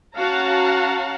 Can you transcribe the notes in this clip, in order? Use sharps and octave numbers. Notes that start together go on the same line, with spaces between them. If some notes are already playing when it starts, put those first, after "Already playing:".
C#4 F#4 F5 F#5 A5 A#5